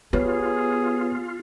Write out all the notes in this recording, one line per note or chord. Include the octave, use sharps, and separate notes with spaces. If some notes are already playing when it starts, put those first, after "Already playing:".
B3 F4 G4 G#4 B4 C#5